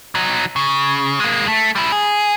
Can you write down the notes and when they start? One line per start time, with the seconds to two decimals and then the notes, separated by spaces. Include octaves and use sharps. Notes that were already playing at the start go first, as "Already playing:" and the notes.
0.15 F#3 D#4
0.56 C#3
1.20 G#3 A#3
1.48 A3
1.76 G3 E4
1.92 G#4